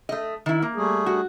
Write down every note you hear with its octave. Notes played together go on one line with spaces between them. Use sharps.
A3 D#5
D#3 E4
A#3
G3 A3 G#4
F#4